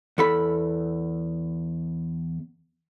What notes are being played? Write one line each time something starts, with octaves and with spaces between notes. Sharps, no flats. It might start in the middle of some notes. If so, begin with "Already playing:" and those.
E2 A4 B5